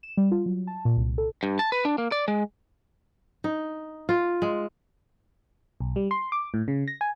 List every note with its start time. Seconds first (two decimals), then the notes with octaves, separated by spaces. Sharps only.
0.03 E7
0.17 G3
0.32 F4
0.46 F#3
0.67 A5
0.85 A#2
0.97 C2
1.18 A4
1.43 G2
1.59 A5
1.72 B4
1.85 D4
1.98 A#3
2.12 D5
2.28 G#3
3.44 D#4
4.09 F4
4.42 G#3
5.81 B1
5.96 G3
6.11 C6
6.32 D6
6.54 A2
6.68 C#3
6.88 A#6
7.01 G#5